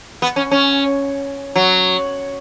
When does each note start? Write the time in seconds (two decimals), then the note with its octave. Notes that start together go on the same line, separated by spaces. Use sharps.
0.22 B3
0.36 C#4
0.51 C#4
1.56 F#3